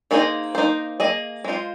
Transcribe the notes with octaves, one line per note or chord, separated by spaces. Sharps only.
D#3 A#3 G#4 C5 D#5
A#3 D#4 C5
A#3 G#4 D#5
G#3 F4 C5